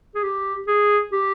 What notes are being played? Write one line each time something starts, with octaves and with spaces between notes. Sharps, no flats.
G#4
G4
G#4
G4